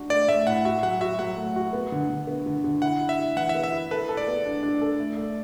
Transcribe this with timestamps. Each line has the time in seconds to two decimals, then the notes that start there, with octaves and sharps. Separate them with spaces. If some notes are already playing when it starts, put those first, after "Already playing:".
Already playing: D4 F#4
0.10 A3 D5
0.28 A3 E5
0.47 A2 F#5
0.65 F#4 E5
0.83 F#3 F#5
1.01 F#4 E5
1.19 F#3 F#5
1.37 A3
1.56 F#4
1.73 B3
1.92 D3
2.09 D3
2.27 B3
2.46 D3
2.64 D3
2.82 E4 F#5
3.01 E4
3.09 E5
3.19 E4
3.36 E3 F#5
3.49 E5
3.54 B3
3.64 E5
3.72 E4
3.91 A4 B4
4.09 A4
4.17 D5
4.28 B3
4.45 D4
4.63 D4
4.81 A4
5.00 A3
5.17 A3